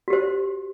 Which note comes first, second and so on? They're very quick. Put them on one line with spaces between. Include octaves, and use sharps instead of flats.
F#4 G4 C5